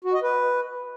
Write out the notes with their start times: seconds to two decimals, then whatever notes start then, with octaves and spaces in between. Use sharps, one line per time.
0.04 F#4
0.13 D#5
0.23 B4